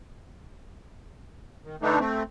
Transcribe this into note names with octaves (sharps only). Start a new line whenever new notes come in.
D#3
D3 E3 A3 D4 D#4
A3 C4